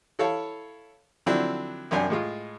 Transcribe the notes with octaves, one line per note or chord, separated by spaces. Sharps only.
E4 A4 C#5 F5
D3 F3 F#3 C4 D4 E4
C2 F#2 D4 G#5
A2 G#3 F4